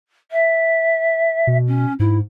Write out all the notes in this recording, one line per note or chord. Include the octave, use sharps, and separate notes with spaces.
E5
B2
C#4
G#2 E4